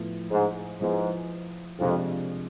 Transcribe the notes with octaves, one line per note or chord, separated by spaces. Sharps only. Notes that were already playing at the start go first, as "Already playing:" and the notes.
Already playing: A2 F3 B3 E4
G#2
G#2 F3 B3 E4
F2 C3 F3 G#3 D4 F4